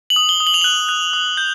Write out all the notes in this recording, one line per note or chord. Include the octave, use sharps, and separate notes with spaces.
F#7
D#6
G7
D#6
F#7
F7
F#6 F#7
F#6
D#6
G6